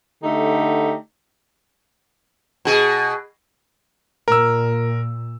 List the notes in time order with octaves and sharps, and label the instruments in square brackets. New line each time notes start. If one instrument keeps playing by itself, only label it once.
[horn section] D3 A3 D#4 G4
[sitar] B2 G#4
[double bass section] A#2 [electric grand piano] A#4 E6